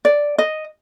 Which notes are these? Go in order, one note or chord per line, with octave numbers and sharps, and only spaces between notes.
D5
D#5